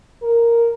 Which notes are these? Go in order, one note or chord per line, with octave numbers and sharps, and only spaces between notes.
A#4